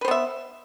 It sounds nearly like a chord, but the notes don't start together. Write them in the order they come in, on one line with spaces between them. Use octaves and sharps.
B4 C5 B3 E5